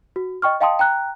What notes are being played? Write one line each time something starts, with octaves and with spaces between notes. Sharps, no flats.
F#4
D#5 G5 C#6 F6
D#5 F5 G5 A5 C6 D#6
G5 A#5 F#6